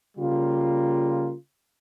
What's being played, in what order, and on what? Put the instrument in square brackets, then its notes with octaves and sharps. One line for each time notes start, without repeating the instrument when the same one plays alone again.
[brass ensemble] C#3 G3 A#3 F4